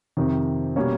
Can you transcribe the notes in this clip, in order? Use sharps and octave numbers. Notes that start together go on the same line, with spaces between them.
F2 C3 D#3
B2 G3 A#3 C#4